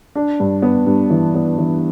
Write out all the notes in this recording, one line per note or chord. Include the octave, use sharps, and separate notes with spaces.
D4
G2
B3
G2
E3
B3
E3